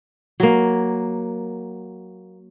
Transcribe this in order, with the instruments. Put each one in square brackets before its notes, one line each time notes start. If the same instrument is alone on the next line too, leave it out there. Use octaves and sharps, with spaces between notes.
[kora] F#3 A#3